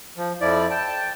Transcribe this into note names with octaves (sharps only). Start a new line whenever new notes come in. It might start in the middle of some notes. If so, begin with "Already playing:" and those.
F3
F2 F3 E4 D5
G5 A5